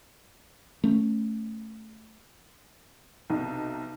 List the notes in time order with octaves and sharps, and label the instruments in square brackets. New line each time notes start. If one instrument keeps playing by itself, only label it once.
[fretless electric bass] A3 C#4
[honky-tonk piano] B1 C3 D#4